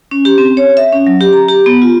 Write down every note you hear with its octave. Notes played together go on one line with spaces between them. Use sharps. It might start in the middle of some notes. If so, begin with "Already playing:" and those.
C#4
G4
C4
C#5
E5
C#4
F#3
G4
A#5
G4
B3
F4